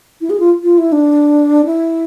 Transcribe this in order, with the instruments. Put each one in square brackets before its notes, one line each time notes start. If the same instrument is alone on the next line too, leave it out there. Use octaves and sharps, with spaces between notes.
[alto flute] E4
G#4
F4
F4
E4
D4
E4